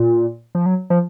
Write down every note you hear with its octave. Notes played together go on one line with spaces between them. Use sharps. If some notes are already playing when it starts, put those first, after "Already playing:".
Already playing: A#2
F3
F#3
F3